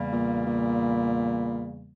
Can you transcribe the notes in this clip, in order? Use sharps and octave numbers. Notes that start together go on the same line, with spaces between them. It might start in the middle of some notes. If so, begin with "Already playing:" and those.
Already playing: E2 C#3 E3 G3 A#3
A#2
A#2